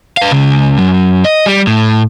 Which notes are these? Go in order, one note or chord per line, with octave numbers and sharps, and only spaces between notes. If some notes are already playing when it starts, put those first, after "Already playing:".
B4 F5
C#2 C#3
F#2
D#5
G3
A2